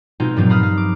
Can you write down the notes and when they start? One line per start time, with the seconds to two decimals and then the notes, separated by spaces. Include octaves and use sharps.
0.20 B2 G#3 C4 D#4 F4
0.36 G2 A#2 F3 F#3 C4 F4
0.50 F5 A#5 B5 D#6 F6
0.63 F5
0.78 D6